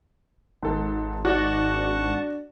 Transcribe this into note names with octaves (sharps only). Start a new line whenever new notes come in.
G#1 G#2 A4
D#4 F#4 D5 F#5 A5 C#6
D4